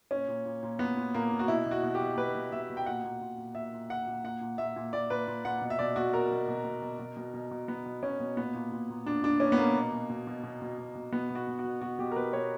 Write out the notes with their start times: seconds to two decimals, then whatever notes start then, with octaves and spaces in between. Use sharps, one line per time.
0.11 A#2 C#4
0.28 A#2
0.45 A#2
0.63 A#2
0.79 A#2 B3
0.97 A#2
1.14 A#2 A#3
1.32 A#2
1.39 F#4
1.48 B2 E4
1.66 B2
1.71 F#4
1.83 B2
1.95 G4
2.00 B2
2.17 B2 B4
2.35 B2
2.52 B2 E5
2.70 B2
2.77 G5
2.86 A#2 F#5
3.04 A#2
3.21 A#2
3.38 A#2
3.55 A#2 E5
3.73 A#2
3.89 A#2 F#5
4.07 A#2
4.24 A#2 F#5
4.41 A#2
4.58 A#2 E5
4.76 A#2
4.93 A#2 D5
5.10 A#2 B4
5.27 A#2
5.45 A#2 F#5
5.61 B2
5.70 E5
5.79 B2 D5
5.96 B2 F#4
6.13 B2 A#4
6.31 B2
6.48 B2
6.65 B2
6.82 B2
6.99 B2
7.17 B2
7.34 B2
7.51 B2
7.68 B2 B3
7.86 B2
8.02 B2 C#4
8.20 B2
8.37 A#2 B3
8.54 A#2
8.72 A#2
8.90 A#2
9.06 A#2 D4
9.23 A#2 D4
9.40 A#2 C#4
9.52 B3
9.58 A#2 A#3
9.75 B2
9.92 B2
10.10 B2
10.27 B2
10.43 B2
10.62 B2
10.78 B2
10.95 B2
11.12 B2 B3
11.30 B2
11.35 F#4
11.48 B2
11.59 F#4
11.64 B2
11.81 B2 F#4
11.99 B2 G4
12.12 A#4
12.16 B2 B4
12.33 B2 C#5